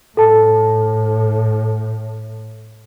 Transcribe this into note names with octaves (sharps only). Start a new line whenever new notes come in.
A2 A4 A5